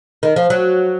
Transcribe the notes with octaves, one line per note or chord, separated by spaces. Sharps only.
D#3
F3
F#3